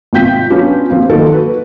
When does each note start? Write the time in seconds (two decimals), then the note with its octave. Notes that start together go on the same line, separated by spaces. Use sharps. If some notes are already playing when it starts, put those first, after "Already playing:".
0.13 G#1 C3 F4 G5 G6 B6
0.50 F#3 B3 C#4 D4 F4 G4
0.89 F3 A#3 C4 F4
1.09 D#3 F#3 A#3 A4 A#4
1.32 F#4 B4